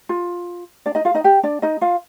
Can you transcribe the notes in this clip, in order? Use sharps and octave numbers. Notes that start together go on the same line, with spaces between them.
F4
D4 D5
D#4 D#5
F4 F5
D#4 D#5
G4 G5
D4 D5
D#4 D#5
F4 F5